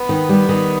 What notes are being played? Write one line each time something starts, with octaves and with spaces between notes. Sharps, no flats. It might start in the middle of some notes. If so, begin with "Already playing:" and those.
Already playing: B3 B4
D#3
G3
D#3